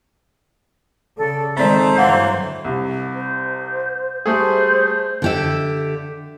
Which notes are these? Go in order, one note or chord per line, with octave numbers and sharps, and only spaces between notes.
C#3 A4 D5
D#3 G#3 A3 C4 C5 D5 A#5
G2 D3 E3 F#3 A#3 F#5
C2 C3
C5
G3 A3 G#4 C5
D3 G4 E5